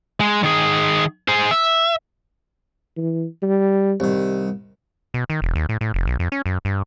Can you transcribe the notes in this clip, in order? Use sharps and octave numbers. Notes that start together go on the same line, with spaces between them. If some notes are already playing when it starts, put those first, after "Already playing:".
G#3
D#3 G#4
G#4 C5
E5
E3
G3
C2 D#3 G3
B2
D#3
E1
D#2
A2
A2
F1
B1
F2
C#4
F#2
G2